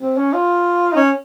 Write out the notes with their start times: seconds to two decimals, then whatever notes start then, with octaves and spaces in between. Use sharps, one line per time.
0.02 C4
0.17 C#4
0.33 F4
0.93 D#4
0.96 C#4